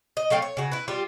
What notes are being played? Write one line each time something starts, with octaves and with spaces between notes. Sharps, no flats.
D#5
F#3 A3 F5 G5
C#5
C#3 F#4
E4 B4
G3 F4 G4